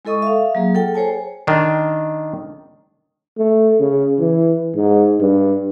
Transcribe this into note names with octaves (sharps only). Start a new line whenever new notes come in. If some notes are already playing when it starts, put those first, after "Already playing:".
G#3 E4 A4 D#5 C#6 D#6
E5 F5
F#3 A#3 G#4
F4 A4 F#5 G5 A5
G#4 C5 C#5 G#5 A5
D#3 D4
A3
C#3
E3
G#2
G2